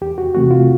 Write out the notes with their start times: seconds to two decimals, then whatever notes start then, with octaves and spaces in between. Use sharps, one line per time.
0.01 E2 G4
0.18 F#4
0.34 C3 E3 A3 C4 F#4
0.51 F4